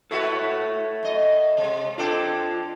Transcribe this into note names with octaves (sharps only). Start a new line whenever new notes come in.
E4 F#4 A4 B4 C#5 E5
F#2 D#5
C3 G#3
D4 F4 A4 C5 G5